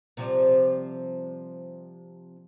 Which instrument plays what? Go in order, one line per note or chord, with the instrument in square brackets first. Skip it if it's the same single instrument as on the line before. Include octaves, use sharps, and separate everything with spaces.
[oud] C3 F3 G3